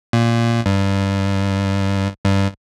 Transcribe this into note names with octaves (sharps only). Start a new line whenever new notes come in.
A#2
G2
G2